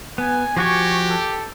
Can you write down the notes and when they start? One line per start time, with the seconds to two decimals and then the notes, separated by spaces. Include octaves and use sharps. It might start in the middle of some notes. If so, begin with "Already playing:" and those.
0.18 B3 G#5
0.56 F3 F#4 G4 G#5 C#6
1.06 A4